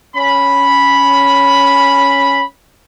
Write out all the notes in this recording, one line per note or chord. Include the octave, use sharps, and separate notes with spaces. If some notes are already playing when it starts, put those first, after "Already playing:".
C#4 B5